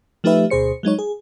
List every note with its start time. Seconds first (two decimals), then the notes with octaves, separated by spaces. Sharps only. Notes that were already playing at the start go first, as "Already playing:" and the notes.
0.24 F3 A3 D#4 G4 B4 E5
0.50 D2 B2 G#4 C5 C#7
0.83 F#3 G#3 D#4 C#5
0.99 G#4